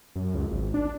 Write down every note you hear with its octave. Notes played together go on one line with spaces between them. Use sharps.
F#2
C#2
G#1
D4